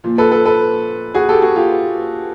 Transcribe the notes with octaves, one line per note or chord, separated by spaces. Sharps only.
A#2 F3
A4 B4
A4 B4
A4 B4
F#4 G#4
G4 A4
F#4 G#4
F4 G4